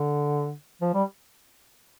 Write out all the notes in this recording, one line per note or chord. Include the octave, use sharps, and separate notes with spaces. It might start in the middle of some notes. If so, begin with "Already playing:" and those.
Already playing: D3
F3
G3